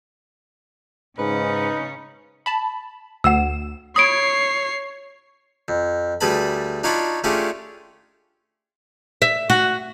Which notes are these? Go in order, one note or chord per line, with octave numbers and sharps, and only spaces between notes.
G#2 C#3 C#4 D#4 B4
A5 B5
D2 F#5 E6 E7
C#5 B5 D#6 G#6 C7 D7
F2
D2 G3 G#4 B4 A5 B5
D4 D#4 F4 C#5 A5 B5
A3 C#4 D4 F4 G4 G#4
E5
F#4